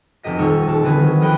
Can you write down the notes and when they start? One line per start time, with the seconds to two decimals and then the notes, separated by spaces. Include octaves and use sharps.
0.23 F1 C3 G4 D#5 B6
0.39 D#1 G3 D#4 C#6 E6
0.67 D#1 A5
0.83 D3 E3 C4 G#4 B4
0.97 D#3 F#3
1.21 F3 D#5 F#5 G5 B5 F#6